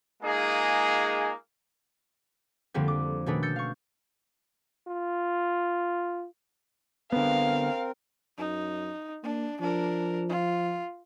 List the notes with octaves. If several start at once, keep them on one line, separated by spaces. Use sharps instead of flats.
G#3 A#3 D#4 F4 G#4
F2 D3 F3 G3 A#3 C4
D6
B2 D#3 A3 C#4 D4 B4
E6 G6 A6 C#7
F5 C#6
F4
D3 B3 C4 A#4 F5
F#2 D#4
A#3 D4
F3 D4 A#4
F4